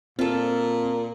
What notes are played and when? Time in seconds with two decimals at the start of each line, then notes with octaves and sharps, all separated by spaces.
0.19 A#2 C4 F4 A4